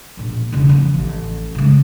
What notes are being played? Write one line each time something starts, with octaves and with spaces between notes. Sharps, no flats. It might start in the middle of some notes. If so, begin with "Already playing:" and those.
E1 A#1
E1 C#3
E3 F3
A1
C#3 G#3